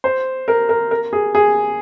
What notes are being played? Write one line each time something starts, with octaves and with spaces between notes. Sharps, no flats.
C5
A#4
A#4
A#4
G#4
G#4